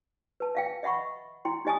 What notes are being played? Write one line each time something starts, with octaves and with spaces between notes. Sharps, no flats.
B4 A5
E5 F5 G5
D#5 E5 F#5 B5 C#6
E4 G5 C6
D#4 G4 D#5 G#5 A5 D#6